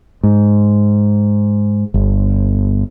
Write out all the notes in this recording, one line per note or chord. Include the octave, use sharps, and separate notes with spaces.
G#2
G1